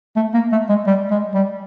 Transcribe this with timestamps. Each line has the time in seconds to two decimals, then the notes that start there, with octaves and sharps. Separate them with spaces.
0.16 A3
0.34 A#3
0.52 A3
0.69 G#3
0.87 G3
1.11 G#3
1.34 G3